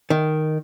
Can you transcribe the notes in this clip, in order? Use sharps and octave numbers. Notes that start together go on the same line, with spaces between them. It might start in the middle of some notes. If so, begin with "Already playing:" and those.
D#3